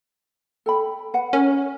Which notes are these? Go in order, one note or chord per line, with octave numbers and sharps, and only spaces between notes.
A4 G5 B5
B4 F#5
C#4 A#4